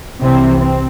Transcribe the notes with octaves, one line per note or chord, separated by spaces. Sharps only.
C2 C3 E3 C4
C4